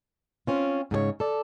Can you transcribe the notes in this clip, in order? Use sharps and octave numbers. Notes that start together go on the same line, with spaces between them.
C4 C#4 F4
G#2 C#3 G#4 C#5
A4 D5